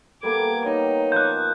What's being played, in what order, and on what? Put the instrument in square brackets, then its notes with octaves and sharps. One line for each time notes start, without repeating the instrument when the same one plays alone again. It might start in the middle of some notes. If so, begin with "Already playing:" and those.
[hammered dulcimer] G3 A#3 B3 [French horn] A4 [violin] D6 G#6
[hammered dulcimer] G3 [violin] D#4 [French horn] C#5
[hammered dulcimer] F3 D#5 D6 [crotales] F#6 G6